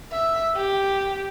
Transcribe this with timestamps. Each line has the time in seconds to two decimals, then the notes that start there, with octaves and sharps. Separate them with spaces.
0.12 E5
0.56 G4